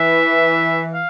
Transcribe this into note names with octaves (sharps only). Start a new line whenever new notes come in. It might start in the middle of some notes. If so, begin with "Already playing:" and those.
Already playing: E3 E5
F5